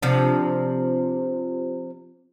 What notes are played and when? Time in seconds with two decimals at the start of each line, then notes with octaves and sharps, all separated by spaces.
0.02 C3 F3 D4